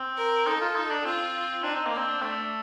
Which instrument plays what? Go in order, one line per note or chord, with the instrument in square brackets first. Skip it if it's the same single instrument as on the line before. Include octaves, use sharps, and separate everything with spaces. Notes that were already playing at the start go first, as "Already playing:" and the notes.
Already playing: [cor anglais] C4
[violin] A#4
[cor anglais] D#4 [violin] A4
[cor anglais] F4
D#4
D4
[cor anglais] C4 [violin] F4
[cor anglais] D4 [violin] D#4
[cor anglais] C4
A#3
[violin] D4
[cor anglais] C4
A3